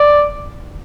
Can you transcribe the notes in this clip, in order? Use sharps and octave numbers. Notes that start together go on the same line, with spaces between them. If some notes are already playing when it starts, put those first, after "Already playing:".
Already playing: D5